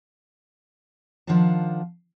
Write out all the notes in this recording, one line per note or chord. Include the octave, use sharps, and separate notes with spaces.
D#3 F3 D4 F5 F#5 A5